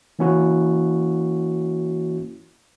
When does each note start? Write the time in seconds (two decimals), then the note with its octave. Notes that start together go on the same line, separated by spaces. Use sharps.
0.19 E3 A#3 C#4 E4 F#4